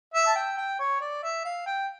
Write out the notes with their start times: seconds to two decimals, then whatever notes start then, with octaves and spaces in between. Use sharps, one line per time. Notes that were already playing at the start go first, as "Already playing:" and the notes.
0.14 E5
0.26 A5
0.35 G5
0.58 G5
0.79 C#5
1.01 D5
1.23 E5
1.45 F5
1.66 G5